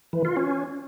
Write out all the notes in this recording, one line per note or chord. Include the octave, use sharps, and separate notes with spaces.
E3
F4
C#4